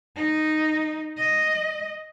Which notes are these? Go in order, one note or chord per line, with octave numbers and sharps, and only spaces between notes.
D#4
D#5